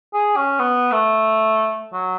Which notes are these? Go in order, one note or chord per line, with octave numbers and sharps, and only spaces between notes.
G#4
C#4
B3
A3
F#3